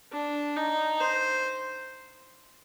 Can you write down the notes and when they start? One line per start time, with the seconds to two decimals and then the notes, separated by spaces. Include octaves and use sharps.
0.13 D4
0.56 D#4
1.00 C5